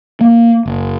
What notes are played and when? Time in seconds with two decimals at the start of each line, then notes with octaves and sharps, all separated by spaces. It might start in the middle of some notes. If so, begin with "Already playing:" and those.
0.21 A#3
0.66 F#1